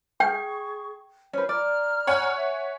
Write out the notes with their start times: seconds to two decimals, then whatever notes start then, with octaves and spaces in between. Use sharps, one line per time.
0.20 G#4 G5 C#6
1.33 C#4 B4 C5
1.49 D5 A#5 F6
2.07 C#5 F#5 G#5
2.35 E5